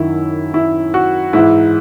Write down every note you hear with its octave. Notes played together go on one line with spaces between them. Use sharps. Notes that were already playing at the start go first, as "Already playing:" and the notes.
Already playing: F#2 D#3 E4
E4
F#4
G#2 E3 E4